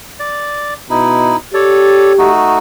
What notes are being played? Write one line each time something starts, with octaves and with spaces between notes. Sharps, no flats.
D5
B2 D#4 E4
G4 A4 C#5 D5
A3 D#4 F#4